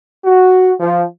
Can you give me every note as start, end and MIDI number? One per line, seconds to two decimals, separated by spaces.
0.25 0.71 66
0.80 1.03 53